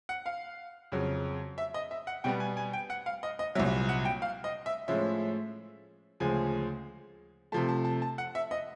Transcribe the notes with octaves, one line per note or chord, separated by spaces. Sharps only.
F#5
F5
F2 C#3 F#3
E5
D#5
E5
F#5
B2 G3 B3 G5
G#5
G#5
G5
F#5
F5
D#5
D#5
C2 A#2 F#3 E5
F#5
G5
F5
D#5
E5
A2 F3 G#3 C#4 E5
D2 C#3 F3 G#3 G#5
C3 F3 A3 A5
A5
A5
A5
F#5
E5
D#5